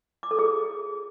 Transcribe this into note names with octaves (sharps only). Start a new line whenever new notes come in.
D6
A4
G#4